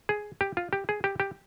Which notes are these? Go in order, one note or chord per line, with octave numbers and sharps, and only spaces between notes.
G#4
G4
F4
G4
G#4
G4
G4